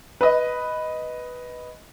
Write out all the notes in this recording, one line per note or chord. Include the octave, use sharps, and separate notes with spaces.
B4 D#5